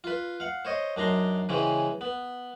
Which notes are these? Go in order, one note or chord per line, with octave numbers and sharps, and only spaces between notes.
F4 B4
F5 F#5
C5 C#5 D#5
F#2 D4 D#4 A#5 C6
C#3 E3 G#3 C4 C#4
B3